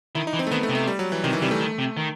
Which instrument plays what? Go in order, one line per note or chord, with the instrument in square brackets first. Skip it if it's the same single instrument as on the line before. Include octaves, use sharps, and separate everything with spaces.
[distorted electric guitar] D#3 [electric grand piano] E4
[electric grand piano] D#4
[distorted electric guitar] E3
[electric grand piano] C4
A3
[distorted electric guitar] D#3 [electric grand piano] B3
[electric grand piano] A3
[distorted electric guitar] C3
[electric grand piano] A3
G3
F#3
E3
[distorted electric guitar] C3 [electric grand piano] D#3
[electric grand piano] E3
[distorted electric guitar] C3 [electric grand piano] G3
[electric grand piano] A3
[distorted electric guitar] D#3
C3
D#3